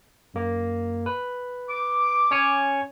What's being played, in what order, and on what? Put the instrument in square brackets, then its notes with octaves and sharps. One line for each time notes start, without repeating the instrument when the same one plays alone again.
[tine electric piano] F#2 A#3
B4
[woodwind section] D6
[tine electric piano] C#4 C#5 G#5